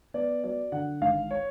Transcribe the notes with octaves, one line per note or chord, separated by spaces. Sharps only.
B3 D5
F#3 D5
D3 F#5
G#1 F5
C#5